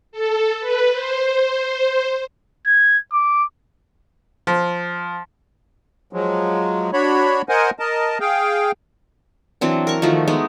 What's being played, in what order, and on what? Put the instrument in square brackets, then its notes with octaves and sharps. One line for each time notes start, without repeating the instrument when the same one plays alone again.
[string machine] A4
B4
C5
[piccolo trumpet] G#6
D6
[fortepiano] F3
[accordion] F3 F#3 G#3
D4 F#4 C#5 B5
A#4 C5 D#5 F#5 G#5
A#4 D#5 A5
G#4 F5 G5
[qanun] E3 F#3 C4 D4
A#4 C#6
D#3 F3 A3 F#4
G#3 A3 B3 D#4